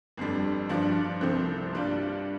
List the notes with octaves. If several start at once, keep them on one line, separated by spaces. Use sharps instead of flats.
G1 F2 D3 G3
G2 F3 D4 F4
C2 C3 F3 A3 C4
G2 G3 D4 F4